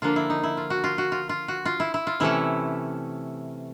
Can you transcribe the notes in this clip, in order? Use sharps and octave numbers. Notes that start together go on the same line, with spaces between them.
D3 F3 A#3 D4 F4
E4
D#4
E4
F4
F#4
F4
F#4
F4
F4
F#4
F4
E4
E4
F4
C3 E3 A3 C#4 E4